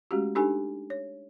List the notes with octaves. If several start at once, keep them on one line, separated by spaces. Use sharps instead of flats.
G#3 A3 C#4 F#4 G4
D4 D#4 G4 A4 G#5
C#5